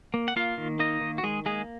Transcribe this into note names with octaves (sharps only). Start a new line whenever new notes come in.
A#3
F#5
A#3 F4 F5
D#3
A#3 D#4 D#5
D#3
F#4
D#3 G#3 G#4
G#3 A#3 G#4